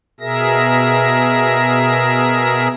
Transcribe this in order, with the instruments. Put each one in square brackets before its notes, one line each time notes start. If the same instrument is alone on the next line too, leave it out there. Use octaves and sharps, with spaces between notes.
[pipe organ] B2 G#4 A#4 E5 A#6